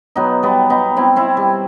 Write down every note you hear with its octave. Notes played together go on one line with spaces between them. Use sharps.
B2 F#3 B3 D#4
G3 B3
B3 D#4
C4 E4
C4 E4
G3